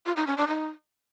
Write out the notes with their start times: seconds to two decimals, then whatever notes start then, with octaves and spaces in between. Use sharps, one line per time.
0.06 F4
0.16 D#4
0.27 C#4
0.37 D4
0.48 D#4